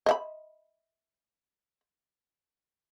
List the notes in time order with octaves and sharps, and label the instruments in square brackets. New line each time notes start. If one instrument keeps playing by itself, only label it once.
[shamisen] D#5 E5 B5